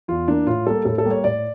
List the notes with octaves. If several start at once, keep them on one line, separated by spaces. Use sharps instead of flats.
E2 F4
E3 A#3 D4
A2 F4
G3 A#3 A4
A2 A4
A4
G3 A#3
C#5
A2 D5